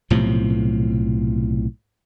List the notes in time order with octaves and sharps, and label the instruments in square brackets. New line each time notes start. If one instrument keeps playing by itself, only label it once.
[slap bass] B1 A2 C3 F3